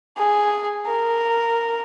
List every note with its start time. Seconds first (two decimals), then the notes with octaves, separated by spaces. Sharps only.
0.17 G#4
0.86 A#4